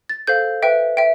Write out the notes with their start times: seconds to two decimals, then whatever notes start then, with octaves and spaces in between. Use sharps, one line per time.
0.09 A6
0.27 A4 C5 F5 G6
0.62 B4 E5 G5
0.97 E5 G5